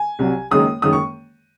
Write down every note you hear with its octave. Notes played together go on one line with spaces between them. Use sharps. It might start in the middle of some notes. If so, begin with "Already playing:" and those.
Already playing: G#5
C2 C3 F#3
F#1 F#2 D#3 G#3 D#6
F#1 F#2 D#3 G#3 D#6
C#6